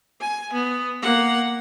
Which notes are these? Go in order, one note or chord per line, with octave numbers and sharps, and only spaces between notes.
G#5
B3
A#3 F#5